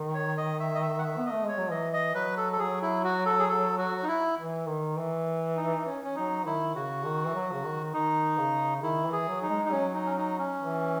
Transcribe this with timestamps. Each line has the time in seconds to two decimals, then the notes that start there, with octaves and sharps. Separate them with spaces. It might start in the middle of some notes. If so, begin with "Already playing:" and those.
Already playing: D#3
0.14 C#5
0.38 D#5
0.60 E5
0.75 D#5
0.82 E5
0.99 F#5
1.04 E5
1.18 B3
1.26 D#5
1.31 A3
1.44 G#3 C#5
1.58 F#3
1.70 E3 D#5
1.93 D#5
2.15 F#3 B4
2.37 A4
2.53 A4
2.59 F#3 G#4
2.82 E4
3.04 F#4
3.26 A4
3.39 G#4
3.49 A4
3.78 F#4
4.03 D#4
4.08 E4
4.38 E3
4.68 D#3
4.97 E3
5.57 D#4
5.86 C#4
6.04 C#4
6.16 F#3 D#4
6.46 D#3 E4
6.75 C#3 F#4
7.04 D#3
7.26 E3
7.35 F#3
7.53 C#3
7.64 D#3
7.94 D#3 D#4
8.38 C#3
8.82 D#3 E4
9.05 E3
9.13 G#4
9.28 F#3
9.42 D#4
9.49 G#3
9.65 D#4
9.72 F#3 C#4
9.94 D#4
10.06 C#4
10.17 D#4
10.39 C#4
10.62 E3